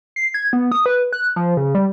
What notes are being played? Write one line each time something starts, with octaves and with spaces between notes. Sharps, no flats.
C7
G#6
B3
D#6
B4
F#6
F3
C#3
G3